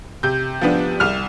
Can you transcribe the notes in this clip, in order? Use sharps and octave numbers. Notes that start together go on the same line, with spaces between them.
C3 G6
F3 B3 D4
C2 F6